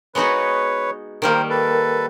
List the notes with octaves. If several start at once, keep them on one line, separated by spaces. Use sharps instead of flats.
G#3 B3 D#4 F#4 B4 C#5
D#3 G3 A#3 A#4 C5
A4 B4